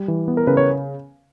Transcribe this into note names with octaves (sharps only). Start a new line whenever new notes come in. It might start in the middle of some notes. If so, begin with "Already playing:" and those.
Already playing: G3
E3
B3
A#4
C#3 B4
C#5